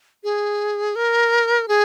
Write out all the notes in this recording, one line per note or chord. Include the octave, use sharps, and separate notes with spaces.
G#4
A#4
G#4